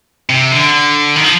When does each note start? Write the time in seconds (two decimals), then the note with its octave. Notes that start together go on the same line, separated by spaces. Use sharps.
0.30 C3
0.52 D3
1.16 D#3
1.24 F3